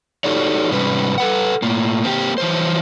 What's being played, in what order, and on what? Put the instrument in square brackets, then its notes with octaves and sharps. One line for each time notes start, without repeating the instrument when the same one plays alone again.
[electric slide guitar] D#4 F#4 G4 A4 C#5 D5
G#2 C3 G3 C#4 B4
A4 B4 F#5
A2 A#3
A#3 C4 F4 G4
E3 F#3 C5